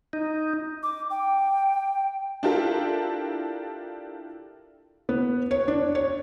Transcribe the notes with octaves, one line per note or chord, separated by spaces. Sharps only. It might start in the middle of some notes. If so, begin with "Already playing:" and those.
D#4
D6
G5
D4 E4 F4 G4 A4 A#4
B3
C#5
D4
C#5